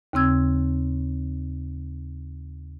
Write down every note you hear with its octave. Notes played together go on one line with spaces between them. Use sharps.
D#2 C#3 C4 E6 G#6